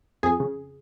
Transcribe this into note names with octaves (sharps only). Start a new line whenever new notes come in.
F2 G#4
C#3